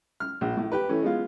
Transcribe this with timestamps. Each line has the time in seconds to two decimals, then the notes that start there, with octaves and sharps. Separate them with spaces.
0.20 F6
0.41 A#1
0.57 A2
0.72 G4 B4
0.89 E3 A3 C#4
1.03 G#3 B3 F4